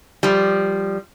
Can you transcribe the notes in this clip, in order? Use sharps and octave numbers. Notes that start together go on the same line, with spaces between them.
F3 G3